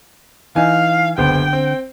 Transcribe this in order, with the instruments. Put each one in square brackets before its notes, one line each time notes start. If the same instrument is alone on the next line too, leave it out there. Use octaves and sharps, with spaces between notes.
[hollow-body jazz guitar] E3 D#4 [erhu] F5 [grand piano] G#5
[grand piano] F#1 B3 C5 [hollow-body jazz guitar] D3 [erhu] G5
[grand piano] C4